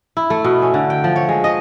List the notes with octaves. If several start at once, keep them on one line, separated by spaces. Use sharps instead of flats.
E4
A3
B2
C#4
D3
G5
F3
C#5
G#3
D#5